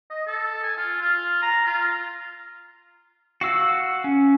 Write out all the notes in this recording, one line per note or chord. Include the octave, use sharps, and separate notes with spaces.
D#5
A4
G#5
F4
F4
A#5
F4
F#4 F5 E6
C#4